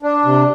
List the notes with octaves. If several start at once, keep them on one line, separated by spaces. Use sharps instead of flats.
D4
C3